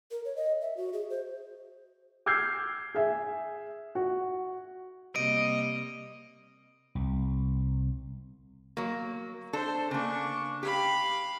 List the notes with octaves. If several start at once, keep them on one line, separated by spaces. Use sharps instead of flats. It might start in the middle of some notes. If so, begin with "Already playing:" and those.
A#4
C#5
D#5
E5
F#4
G#4
C5
D6 E6 F6 G6 G#6 C7
G#4 E5
F#4
C3 G3 A#3 D#5 D7
C2
F#3 A#3
D4 A4 C5
C#3 A#3 D4 C#6
G4 F5 B5